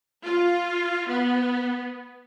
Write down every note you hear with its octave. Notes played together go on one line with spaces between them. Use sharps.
F4
B3